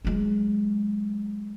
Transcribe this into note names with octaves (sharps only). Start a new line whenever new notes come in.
F#3 G#3